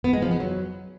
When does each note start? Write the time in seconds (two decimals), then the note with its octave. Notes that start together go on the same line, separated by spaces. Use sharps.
0.04 B3
0.13 G#3
0.22 F3
0.31 B3
0.40 F#3